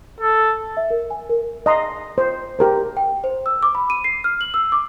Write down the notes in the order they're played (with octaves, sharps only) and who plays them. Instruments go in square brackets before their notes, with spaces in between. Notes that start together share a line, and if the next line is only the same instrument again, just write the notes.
[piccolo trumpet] A4
[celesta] E5
A#4
G#5
A#4
[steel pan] D#5 A#5 C6
C5
G4 A#4 C5
[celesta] G5
C5
E6
D6
B5
D#7
C7
F6
F#7
E6
D6